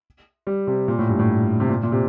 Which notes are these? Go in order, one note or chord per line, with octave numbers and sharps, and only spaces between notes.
G3
C3
A#2
A2
G2
A2
C3
A#2
A#2
C3